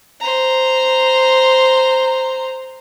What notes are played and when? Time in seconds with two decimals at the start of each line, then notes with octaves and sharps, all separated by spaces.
0.20 C5 A#5